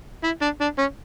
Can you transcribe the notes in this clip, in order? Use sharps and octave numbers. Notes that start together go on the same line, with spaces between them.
E4
D4
D4
C#4